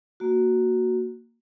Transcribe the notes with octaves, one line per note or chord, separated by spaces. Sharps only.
A#3 F#4